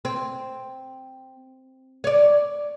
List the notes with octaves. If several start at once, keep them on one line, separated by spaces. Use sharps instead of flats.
C4
C#5 D5